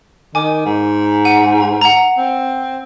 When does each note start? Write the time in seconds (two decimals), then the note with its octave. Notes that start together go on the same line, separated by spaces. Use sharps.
0.35 D#3 G#5 D6
0.66 G#2
1.25 F#5 D#7
1.81 F#5 A#5
2.18 C4